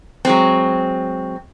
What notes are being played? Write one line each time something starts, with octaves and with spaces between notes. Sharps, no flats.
F#3 G#3 C4